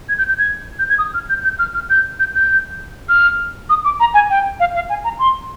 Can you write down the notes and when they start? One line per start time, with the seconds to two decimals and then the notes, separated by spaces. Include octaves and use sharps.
0.09 G#6
0.18 G6
0.29 G6
0.39 G#6
0.79 G6
0.89 G#6
0.98 D#6
1.14 F6
1.29 G6
1.44 G6
1.59 F6
1.74 F6
1.90 G6
2.20 G6
2.35 G6
3.09 F6
3.69 D#6
3.85 D6
4.00 A#5
4.14 G#5
4.30 G5
4.60 F5
4.75 F5
4.89 G#5
5.04 A#5
5.19 C6